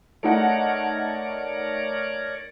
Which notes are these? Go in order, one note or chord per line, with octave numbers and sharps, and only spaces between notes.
A3 D#4 A#4 C#5 D5 F#5